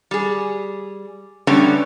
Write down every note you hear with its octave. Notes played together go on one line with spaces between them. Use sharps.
G3 G#4
D3 G3 A3 B3 C#4 D4